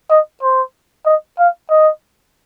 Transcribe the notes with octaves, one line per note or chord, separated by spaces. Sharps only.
D#5
C5
D#5
F5
D#5